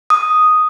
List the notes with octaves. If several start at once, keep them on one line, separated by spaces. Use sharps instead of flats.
D#6